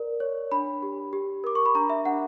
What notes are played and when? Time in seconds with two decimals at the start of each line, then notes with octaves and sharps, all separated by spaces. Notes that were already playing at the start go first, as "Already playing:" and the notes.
Already playing: A#4 D5
0.20 C#5
0.51 D4 B5
0.82 G4
1.13 G4
1.44 A#4 D6
1.55 C#6
1.66 B5
1.75 D4 A#5
1.89 E5
2.05 D4 F#5